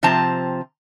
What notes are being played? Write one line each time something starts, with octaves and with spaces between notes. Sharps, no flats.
C3 F3 C4 C5 A5 A#5